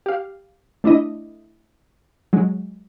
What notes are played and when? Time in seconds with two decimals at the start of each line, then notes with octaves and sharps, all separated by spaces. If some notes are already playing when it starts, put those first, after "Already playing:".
0.06 G4 F5
0.84 A3 D4 E4 D#5
2.33 F#3 G#3